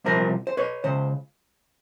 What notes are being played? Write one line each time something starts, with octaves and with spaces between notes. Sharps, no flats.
C2 C3 F3 A#4 C5
C5
B4 C#5
C#2 C#3 C5